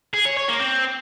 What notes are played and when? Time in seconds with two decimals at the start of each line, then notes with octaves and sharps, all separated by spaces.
0.14 G#4
0.25 C#5
0.37 C#5
0.48 A#3
0.60 C4